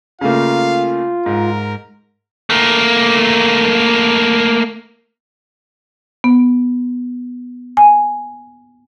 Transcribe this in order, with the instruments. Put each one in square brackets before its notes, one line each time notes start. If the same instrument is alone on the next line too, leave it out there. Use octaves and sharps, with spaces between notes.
[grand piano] C#3 A3 A#3 [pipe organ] F4 [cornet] F5
[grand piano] G#2 [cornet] A#4
[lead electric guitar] A3 A#3
[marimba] B3
G#5